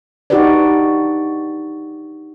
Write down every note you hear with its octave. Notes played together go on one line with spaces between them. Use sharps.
D4 D#4 F#4 G4 B4 D5